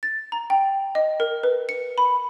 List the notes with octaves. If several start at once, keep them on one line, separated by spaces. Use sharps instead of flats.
A6
A#5
G5
D#5
A#4
B4
C#7
B5